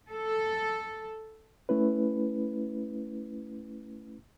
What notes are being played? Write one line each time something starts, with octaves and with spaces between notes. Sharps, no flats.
A4
A3 C#4 E4 B4